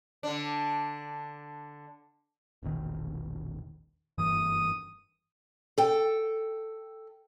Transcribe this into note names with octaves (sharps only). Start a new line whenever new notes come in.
D3 D4
E1 A#1 D#3
F#1 G2 E3 D#6
A4 G5